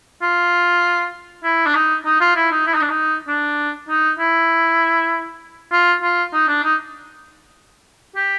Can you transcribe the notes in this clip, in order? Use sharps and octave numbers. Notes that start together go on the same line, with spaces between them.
F4
E4
D4
D#4
D#4
F4
E4
D#4
E4
D#4
D4
D#4
D4
D#4
E4
F4
F4
D#4
D4
D#4
G4